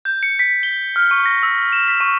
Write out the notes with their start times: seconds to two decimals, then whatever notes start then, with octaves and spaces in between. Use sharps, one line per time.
0.05 G6
0.23 C#7
0.39 B6
0.63 G7
0.96 F6
1.11 C#6
1.26 A#6
1.43 E6
1.73 E7
1.88 B6
2.00 C#6